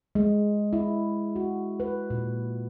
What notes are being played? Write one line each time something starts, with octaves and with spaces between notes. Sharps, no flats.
G#3
E4
F#4
B4
A#2